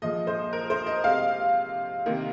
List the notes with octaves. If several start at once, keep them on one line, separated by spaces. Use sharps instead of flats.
A#2 F3 G#3 D#5
C5
A#4
C5
D#5
C3 G#3 C4 F5
C3 D#3 A#3